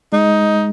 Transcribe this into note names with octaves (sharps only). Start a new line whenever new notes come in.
G#3 D#4